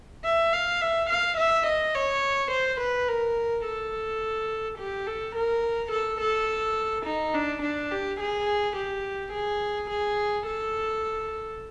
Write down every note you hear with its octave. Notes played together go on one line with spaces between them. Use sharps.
E5
F5
E5
F5
E5
D#5
C#5
C5
B4
A#4
A4
G4
A4
A#4
A4
A4
D#4
D4
D4
G4
G#4
G4
G#4
G#4
A4